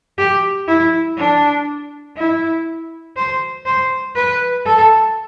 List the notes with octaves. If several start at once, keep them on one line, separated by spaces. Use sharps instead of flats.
G4
E4
D4
E4
C5
C5
B4
A4